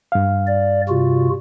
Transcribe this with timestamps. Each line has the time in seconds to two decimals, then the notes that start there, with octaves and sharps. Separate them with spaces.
0.12 G2 F5
0.47 D5
0.89 C3 F4 F#4